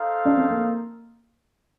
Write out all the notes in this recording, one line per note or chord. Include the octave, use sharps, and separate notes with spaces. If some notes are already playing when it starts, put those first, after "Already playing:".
Already playing: D#4 A4 C5 F5
D4
C4
A#3